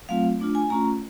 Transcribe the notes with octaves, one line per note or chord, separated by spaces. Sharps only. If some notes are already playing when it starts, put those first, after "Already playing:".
F#3 A3 C4 F4 F5
A3 D4 F4
G#5
A3 C#4 F4 A#5